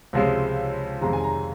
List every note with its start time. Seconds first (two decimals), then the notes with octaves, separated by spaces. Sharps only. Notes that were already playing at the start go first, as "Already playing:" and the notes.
0.13 C#2 C3 F3 G#3
1.01 F2 C3 D#3 G#3 A#5
1.13 G#5
1.24 A#5